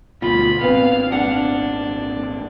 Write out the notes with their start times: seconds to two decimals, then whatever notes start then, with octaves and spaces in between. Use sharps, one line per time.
0.22 D2 B2 F4 B5
0.61 G#1 A#2 B3 C4 F5
1.12 D4 F#5